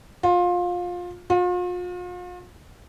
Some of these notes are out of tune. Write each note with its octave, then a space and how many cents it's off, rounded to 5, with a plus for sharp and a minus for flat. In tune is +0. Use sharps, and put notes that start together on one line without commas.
F4 +20
F4 +40